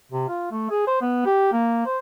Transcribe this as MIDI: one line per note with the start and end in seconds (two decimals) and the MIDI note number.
0.12 0.25 48
0.29 0.47 65
0.52 0.70 57
0.71 0.86 68
0.87 1.00 72
1.02 1.23 59
1.26 1.49 67
1.52 1.85 58
1.86 1.98 72